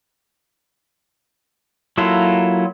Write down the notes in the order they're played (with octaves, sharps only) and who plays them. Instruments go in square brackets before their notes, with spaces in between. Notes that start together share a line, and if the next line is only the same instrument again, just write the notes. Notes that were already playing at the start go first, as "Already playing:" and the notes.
[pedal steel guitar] F#3 A#3 E4 F4 A4